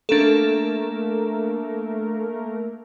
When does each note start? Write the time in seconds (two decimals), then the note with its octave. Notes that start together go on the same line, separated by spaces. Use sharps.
0.09 A3 A#3 D4 A4 A#4